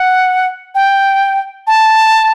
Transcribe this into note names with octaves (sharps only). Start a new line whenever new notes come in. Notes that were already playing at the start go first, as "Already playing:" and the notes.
Already playing: F#5
G5
A5